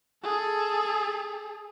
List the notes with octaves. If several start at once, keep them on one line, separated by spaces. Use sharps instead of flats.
G#4 A4